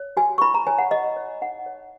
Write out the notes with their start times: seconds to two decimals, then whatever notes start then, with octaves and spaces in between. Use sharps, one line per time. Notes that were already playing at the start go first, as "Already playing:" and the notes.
Already playing: C#5
0.17 F#4 G#5
0.38 C#6
0.41 E4 B5
0.54 A#5
0.67 C#5 G#5
0.78 F#5
0.91 E4 D#5
1.16 C#5
1.42 D#4 F#5
1.66 C#5